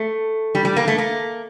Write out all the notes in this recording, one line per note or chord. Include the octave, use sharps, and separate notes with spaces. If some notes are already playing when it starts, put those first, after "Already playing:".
Already playing: A3
G3
G3
A#3
A3
A#3